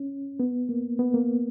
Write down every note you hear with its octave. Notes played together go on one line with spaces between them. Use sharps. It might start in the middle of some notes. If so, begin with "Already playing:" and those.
Already playing: C#4
B3
A#3
B3
A#3